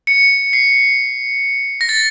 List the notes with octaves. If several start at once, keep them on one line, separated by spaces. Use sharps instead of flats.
C#7
C7
A#6
A6